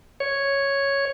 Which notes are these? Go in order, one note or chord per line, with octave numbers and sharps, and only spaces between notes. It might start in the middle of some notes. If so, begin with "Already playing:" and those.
C#5